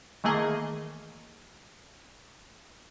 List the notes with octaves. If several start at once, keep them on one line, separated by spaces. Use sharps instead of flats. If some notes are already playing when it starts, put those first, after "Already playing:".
D#3 E3 A3 A#3 G#4 D#5